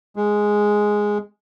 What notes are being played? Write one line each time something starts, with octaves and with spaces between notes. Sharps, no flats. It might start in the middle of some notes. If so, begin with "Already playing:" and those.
G#3